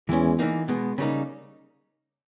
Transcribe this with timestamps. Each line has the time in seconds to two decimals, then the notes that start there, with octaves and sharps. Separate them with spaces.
0.09 E2 E3 G#3 C#4
0.39 E3 A#3 D#4
0.68 B2 G#3 B3
0.98 C#3 G3 A#3 D#4